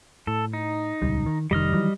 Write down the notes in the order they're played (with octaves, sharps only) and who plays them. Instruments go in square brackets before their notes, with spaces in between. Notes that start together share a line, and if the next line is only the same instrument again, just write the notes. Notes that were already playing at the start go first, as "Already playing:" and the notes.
[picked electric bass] A2 [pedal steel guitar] A4
[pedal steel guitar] D#4
[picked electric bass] D#1 C#2 G3
D#3
[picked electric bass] F1 D#3 [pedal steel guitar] G3 D#5 F6
[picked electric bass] D#3 E3 F#3